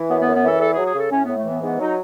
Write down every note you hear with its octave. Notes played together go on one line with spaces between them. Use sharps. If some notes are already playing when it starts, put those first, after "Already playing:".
Already playing: E3
F#2 B3
B3
F#2
B3
E3 A4
E2 A4
G#4
F#3
G#4
C#3 A4
A2 C#4
A2 B3
A3
E3 B3
G#2 B3
F#3 D#4